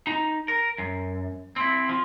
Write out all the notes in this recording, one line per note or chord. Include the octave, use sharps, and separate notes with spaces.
D#4 A#5
A#4
F#2
C4 E4
F3